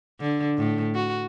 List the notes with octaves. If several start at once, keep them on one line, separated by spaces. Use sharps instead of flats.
D3
A2
F#4